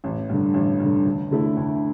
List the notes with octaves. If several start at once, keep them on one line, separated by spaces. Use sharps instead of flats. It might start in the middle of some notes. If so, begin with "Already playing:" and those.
A1
G2 D3
A1
G2 D3
D2
D3 A3 E4
D2